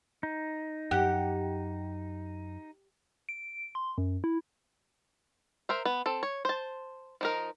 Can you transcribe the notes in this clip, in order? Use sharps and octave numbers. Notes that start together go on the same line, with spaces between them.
D#4
F#2 G4 F#5
D7
C6
F#2
E4
A#4 C5 E5
B3
C4 A4
C#5
C5 A5
F3 D#4 A#4